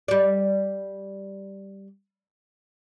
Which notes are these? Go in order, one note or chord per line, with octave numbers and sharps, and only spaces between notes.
G3 D5